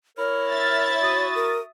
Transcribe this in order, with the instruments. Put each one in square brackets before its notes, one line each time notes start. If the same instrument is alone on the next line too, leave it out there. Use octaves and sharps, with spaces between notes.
[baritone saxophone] E4 [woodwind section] A#4 F6 [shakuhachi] C#5
[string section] E5 A6
[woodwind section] F#4 D#6
[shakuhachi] A#4